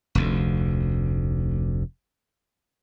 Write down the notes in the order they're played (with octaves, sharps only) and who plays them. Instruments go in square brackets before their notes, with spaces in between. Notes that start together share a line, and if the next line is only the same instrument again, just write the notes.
[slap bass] F1 D2